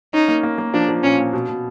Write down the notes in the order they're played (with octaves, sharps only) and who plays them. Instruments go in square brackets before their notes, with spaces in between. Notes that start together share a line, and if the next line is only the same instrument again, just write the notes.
[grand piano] C#4 [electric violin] D#4
[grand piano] A#3
A#3
A#3
[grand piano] F3 [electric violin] D4
[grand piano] F3
[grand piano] A#2 [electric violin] C#4
[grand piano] A#2
B2
B2